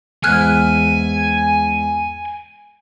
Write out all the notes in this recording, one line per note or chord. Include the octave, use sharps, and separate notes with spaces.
E2 G#2 E3 G#5 F6 F#6 G#6